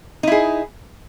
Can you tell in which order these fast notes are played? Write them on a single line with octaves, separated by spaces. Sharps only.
D#4 E4 G#4